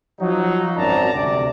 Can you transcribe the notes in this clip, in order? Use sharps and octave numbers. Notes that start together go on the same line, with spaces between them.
F3 F#3 D#4
G#1 F#2 C4 D5 A5 A#5
D2 C3 D5